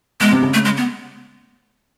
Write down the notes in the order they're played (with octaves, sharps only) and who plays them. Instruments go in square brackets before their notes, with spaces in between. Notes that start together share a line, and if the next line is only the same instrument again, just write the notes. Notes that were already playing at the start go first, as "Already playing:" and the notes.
[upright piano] B2 [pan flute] G#3
[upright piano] C3
C#3
[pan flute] A3
G#3
B3